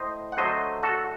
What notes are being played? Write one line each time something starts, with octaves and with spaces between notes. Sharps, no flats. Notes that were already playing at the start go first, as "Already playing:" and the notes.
Already playing: A2 C5 D#5
F#5
D3 F#3 A3 C5 D#5
F#4 A4